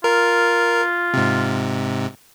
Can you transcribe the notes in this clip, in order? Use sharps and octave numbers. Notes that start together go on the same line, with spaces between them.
F4 A#4
G#2 C3